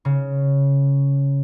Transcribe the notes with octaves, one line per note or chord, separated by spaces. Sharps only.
C#3